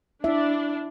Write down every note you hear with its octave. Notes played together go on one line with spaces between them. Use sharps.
D4 E4 E5